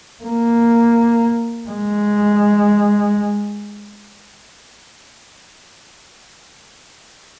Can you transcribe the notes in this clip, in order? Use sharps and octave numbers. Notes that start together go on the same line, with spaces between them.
A#3
G#3